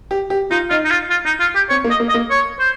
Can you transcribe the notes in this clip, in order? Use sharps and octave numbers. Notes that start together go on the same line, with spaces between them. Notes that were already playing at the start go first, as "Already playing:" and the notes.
G4
G4
D#4 F4
D#4 F4
D#4
F4
F4
D#4
F4
G4
C4 C#5
A#3
D#5
A#3
D#5
A#3
C#5
C5